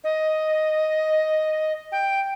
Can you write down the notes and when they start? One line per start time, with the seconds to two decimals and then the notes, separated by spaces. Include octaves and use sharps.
0.04 D#5
1.92 G5